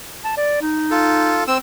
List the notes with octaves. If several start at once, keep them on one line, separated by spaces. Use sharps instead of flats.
A5
D5
D#4
F4 A4
C4 E6